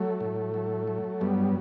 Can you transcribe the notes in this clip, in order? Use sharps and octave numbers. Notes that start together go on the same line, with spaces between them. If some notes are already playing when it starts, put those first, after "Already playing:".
Already playing: F#3 A3
A2
F#3
F#3
G2 G3 B3